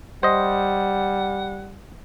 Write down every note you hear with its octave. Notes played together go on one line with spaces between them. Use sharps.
G3 C5 D#5 F#5